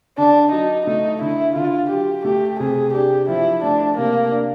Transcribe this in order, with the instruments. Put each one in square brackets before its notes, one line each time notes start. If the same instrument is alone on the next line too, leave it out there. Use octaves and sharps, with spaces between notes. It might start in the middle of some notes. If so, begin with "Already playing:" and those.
[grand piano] D3 [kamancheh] D4
[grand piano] F#3 [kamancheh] D#4
[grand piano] A3 [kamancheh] D#4
[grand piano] D3 [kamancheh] E4
[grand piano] D3 [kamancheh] F4
[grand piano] F#3 [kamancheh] G4
[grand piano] A3 [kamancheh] G4
[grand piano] C3 [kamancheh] G#4
[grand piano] D4 [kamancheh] G4
[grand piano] F3 [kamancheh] E4
[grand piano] A3 [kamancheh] D4
[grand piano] C3 [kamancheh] A#3
[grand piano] D4